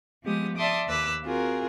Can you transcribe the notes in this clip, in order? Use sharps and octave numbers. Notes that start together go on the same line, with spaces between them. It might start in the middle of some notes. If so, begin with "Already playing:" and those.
F3 G#3 B3 G4 D#6
D5 E5 A5 C6 D6 D#6
D#2 B4 D6 E6 F#6
C4 F4 F#4 G#4 A#4